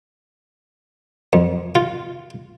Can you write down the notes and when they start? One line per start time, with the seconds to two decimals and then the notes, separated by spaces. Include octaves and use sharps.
1.33 F2
1.75 F4